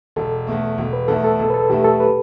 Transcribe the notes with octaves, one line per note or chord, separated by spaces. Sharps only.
E1 A4
E2 B2 A3
E1
B4
E2 B2 A3 A4
A4
E1 A4
B4
A4
E2 B2 A3 G4
A4
B4